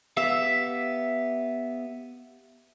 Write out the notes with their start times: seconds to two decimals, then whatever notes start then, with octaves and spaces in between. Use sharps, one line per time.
0.17 B3 G4 E5 F5